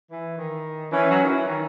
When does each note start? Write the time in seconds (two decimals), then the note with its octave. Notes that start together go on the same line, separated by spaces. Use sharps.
0.11 E3
0.38 D#3
0.92 E3 C#4
1.10 F#3
1.24 D#3
1.29 E3
1.47 D#3